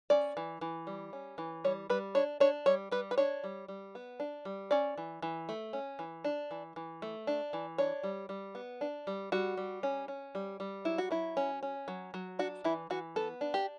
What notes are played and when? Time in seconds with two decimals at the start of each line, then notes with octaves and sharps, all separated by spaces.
0.10 C#4 D5
0.37 E3
0.61 E3
0.87 G3
1.13 C#4
1.38 E3
1.64 G3 C#5
1.90 G3 B4
2.15 D4 C#5
2.40 D4 C#5
2.66 G3 C#5
2.91 G3 B4
3.11 B4
3.18 D4 C#5
3.44 G3
3.68 G3
3.95 B3
4.20 D4
4.45 G3
4.71 C#4 D5
4.97 E3
5.22 E3
5.49 A3
5.73 C#4
5.99 E3
6.24 D4
6.51 E3
6.76 E3
7.02 A3
7.27 D4
7.53 E3
7.78 D4 C#5
8.03 G3
8.29 G3
8.55 B3
8.81 D4
9.07 G3
9.32 G3 F#4
9.57 G3
9.83 C#4
10.08 C#4
10.35 G3
10.60 G3
10.85 F#3 E4
10.98 F#4
11.11 F#3 E4
11.37 C#4
11.63 C#4
11.88 F#3
12.14 F#3
12.39 D4 F#4
12.64 E3 E4
12.90 E3 F#4
13.16 B3 A4
13.41 D4
13.54 G4